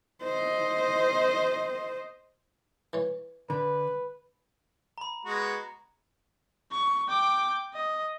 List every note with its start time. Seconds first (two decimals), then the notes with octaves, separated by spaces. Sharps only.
0.22 C5 D#5
2.93 E3 C#5
3.50 D3 B4
4.98 A#5 B5
5.25 G#3 B3 F#4
6.71 C#6
7.09 G5 D6
7.74 D#5